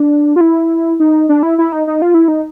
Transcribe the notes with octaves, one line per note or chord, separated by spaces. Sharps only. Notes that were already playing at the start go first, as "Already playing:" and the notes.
Already playing: D4
F4
E4
D#4
D4
E4
E4
D#4
D#4
F4
E4
D#4